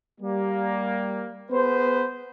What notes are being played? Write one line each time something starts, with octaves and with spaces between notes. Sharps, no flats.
G3 A#3
B3 G#4 B4 C5